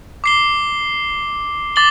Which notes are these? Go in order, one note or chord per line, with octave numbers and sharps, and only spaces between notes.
D6 C7 G7
D6 A6 F#7 G7